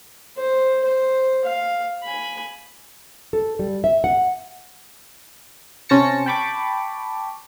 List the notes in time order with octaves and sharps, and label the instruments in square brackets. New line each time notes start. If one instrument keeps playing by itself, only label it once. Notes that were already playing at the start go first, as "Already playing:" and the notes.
[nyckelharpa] C5
C5
F5
G#5 B5
[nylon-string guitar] A4
G3
E5
F#5
[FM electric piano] C3 C#4 C5 A5 A#6 C#7
G5 A5 B5 C#6 D6